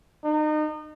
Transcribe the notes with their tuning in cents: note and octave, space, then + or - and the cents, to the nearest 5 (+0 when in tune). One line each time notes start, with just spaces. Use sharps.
D#4 -30